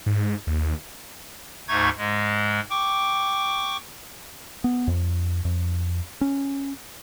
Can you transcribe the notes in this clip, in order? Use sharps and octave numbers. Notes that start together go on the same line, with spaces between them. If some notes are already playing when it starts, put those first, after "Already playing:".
G#2
D#2
D2 G#2 A3 D#4 C#6 G#6
G#2 G#3
G5 C#6 D6
B3
F2
F2
C#4